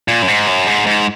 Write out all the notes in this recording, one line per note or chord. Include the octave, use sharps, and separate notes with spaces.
A#2
F#2
G#2
F#2
G#2
G#2